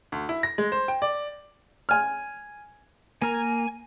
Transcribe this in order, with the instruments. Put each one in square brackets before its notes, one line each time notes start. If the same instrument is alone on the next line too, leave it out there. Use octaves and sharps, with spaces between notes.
[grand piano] D2
E4
A#6
G#3
C5
G5
D5
[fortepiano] G#5 F6
[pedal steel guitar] A#3 A#4 A#5 [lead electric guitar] G#5